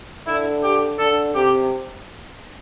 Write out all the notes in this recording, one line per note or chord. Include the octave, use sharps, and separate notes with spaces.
D3 E4
G4
D3 A4
C3 G4